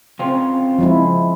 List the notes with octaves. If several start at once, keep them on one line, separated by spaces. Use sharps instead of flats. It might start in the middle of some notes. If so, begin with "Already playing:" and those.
C#3 C4 F4
F3 G#3 E4